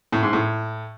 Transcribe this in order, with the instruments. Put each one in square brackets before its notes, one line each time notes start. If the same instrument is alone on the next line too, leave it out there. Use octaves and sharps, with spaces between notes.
[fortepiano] A2
G#2
A2